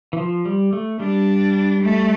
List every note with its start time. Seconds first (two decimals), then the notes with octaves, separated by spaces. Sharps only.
0.13 E3
0.18 F3
0.45 G3
0.73 A3
1.00 G3 D4
1.82 A3